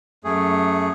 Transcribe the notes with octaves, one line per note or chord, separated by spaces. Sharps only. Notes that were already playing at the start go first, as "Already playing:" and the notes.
F#2 A3 G#4